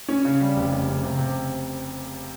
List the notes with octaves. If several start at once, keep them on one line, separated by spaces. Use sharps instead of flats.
C#4
C#3
G3
F1
C#3
C#3
C3
C3